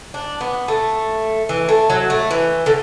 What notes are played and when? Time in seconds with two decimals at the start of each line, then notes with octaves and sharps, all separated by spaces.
0.14 D4
0.41 B3
0.68 A3
1.49 E3
1.69 A3
1.90 F#3
2.10 A3
2.31 E3
2.66 D3